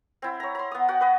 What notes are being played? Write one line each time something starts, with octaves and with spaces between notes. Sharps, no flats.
C4 E4
C#5 A#5
A#5 C6
B3 D#6
F#4 F#5 G5
B4 D#5